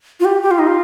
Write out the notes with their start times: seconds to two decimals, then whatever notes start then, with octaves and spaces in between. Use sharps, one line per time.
0.20 F4
0.25 G4
0.42 G4
0.51 F4
0.59 D#4
0.67 F4